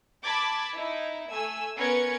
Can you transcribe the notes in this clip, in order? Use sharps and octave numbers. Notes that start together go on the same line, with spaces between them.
A5 B5 D6 G#6 A6
D#4 E4
A3 G#5 E6
B3 C#4 A#4 B4 G#6 C#7